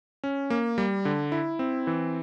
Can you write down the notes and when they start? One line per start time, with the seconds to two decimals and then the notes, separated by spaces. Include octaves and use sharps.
0.24 C#4
0.50 A#3
0.78 G3
1.05 D3
1.32 E4
1.59 C4
1.87 E3